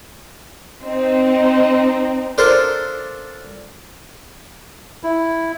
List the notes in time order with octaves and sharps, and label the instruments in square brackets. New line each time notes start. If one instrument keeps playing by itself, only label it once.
[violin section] C4 D#4
[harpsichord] D4 F4 A4 A#4 C5
[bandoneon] E4